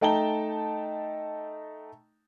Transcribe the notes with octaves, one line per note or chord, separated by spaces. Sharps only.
A3 D#4 G5 A5 A#5 G7